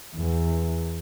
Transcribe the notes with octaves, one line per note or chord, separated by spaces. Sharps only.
E2